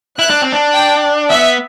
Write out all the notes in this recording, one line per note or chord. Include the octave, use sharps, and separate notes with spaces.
E4 F#6
D4
C4
D4
G5
B3 E5